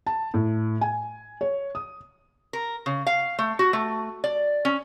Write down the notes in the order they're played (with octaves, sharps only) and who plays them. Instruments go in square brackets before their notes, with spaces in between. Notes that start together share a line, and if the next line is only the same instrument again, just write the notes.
[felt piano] A5
A2
G#5
C#5
D#6
[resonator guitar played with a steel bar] A#4
C#3
F5
A3
F#4
A3
D5
C#4